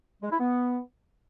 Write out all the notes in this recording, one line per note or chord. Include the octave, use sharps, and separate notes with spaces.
G#3
E4
B3